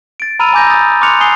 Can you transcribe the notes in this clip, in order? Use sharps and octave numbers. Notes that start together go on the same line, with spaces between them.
A6 D7
A#5 B5 E6 F6 D#7 F7
G#5 D6 G6 A#6
D#6 A6
C6 D6 F6 F#6 C#7 F7
G#5 D#6 C7 G7